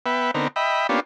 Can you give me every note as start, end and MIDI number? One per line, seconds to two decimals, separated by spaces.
0.06 0.31 59
0.06 0.31 71
0.06 0.31 76
0.06 0.31 79
0.34 0.48 50
0.34 0.48 59
0.34 0.48 60
0.34 0.48 63
0.34 0.48 70
0.56 0.87 75
0.56 0.87 76
0.56 0.87 79
0.56 0.87 83
0.89 1.00 58
0.89 1.00 59
0.89 1.00 61
0.89 1.00 62
0.89 1.00 65
0.89 1.00 67